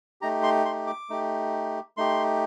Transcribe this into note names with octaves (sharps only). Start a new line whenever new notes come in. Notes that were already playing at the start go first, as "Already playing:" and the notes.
A3 D#4 G4 A#5
C6
C6
D6
A3 D#4 G4
A3 D#4 G4 C6